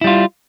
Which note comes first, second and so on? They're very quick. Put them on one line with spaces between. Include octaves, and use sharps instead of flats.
E4 G3 F4